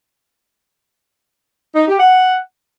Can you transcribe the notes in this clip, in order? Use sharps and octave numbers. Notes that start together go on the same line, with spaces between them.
D#4
G4
F#5